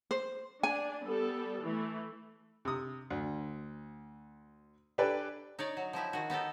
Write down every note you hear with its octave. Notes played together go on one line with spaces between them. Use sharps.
C5
D4 G#5
G3 B3 A4
E3 A3
C3 D#6
D2
D4 G4 A4 B4 D5 G#5
D#4 C#5 D5
F#3
F3 D#4 E4 G4
D#3 F#4
B3 D#4 G4 A4